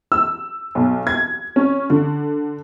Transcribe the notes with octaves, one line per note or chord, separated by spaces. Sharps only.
E6
B1
G#6
C#4
D3